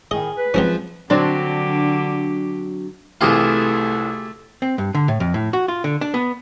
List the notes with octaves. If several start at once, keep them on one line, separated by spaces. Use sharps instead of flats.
A2 D#3 G#4 D#5
B4
F3 F#3 G#3 C4 C#4 F4
D3 F#3 C4 D4 G4
C2 E3 A3 F4 G4 G#4 C6
C4
G2
D3
A2
F2
A2
F#4
F4
D3
D4
B3